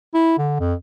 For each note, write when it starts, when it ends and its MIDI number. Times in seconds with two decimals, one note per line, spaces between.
0.14 0.36 64
0.38 0.58 50
0.60 0.74 41